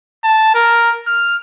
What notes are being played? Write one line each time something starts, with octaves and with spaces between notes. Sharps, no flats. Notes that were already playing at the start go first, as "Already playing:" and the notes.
A5
A#4
F6